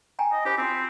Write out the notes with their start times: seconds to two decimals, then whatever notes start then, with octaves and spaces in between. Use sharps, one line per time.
0.19 G5 G#5 A#5
0.32 D#5
0.45 E4 G4 C5 B5
0.58 C4 F4 F#4